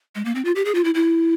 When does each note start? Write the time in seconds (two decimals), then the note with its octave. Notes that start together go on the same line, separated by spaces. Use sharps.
0.15 G#3
0.25 A#3
0.35 C4
0.45 F4
0.55 G4
0.65 G#4
0.75 F4
0.84 E4
0.95 E4